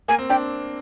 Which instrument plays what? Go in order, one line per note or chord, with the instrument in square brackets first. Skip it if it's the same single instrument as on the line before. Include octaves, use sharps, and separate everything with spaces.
[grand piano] A#3 [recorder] G#5
[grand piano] C4
[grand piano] D4 [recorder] G5